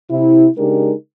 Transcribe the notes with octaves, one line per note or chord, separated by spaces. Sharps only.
C3 E4
C#3 G#3 D4 D#4 G4 A#4